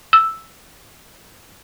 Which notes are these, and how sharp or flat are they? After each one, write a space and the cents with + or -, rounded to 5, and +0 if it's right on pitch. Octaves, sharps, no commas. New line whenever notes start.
E6 +0